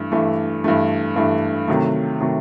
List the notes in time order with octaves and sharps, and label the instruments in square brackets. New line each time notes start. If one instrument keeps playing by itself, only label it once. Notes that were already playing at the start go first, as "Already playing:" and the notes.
Already playing: [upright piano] G2 E3 A3
G2 E3 A3
G2 E3 A3
G2 E3 A3
C3 D#3 F#3 A3
C3 D#3 F#3 A3